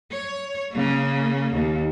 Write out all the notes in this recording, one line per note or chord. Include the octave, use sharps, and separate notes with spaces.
C#5
C#3 A#3
D#2